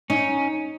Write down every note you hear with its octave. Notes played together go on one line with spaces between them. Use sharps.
C#4 D#4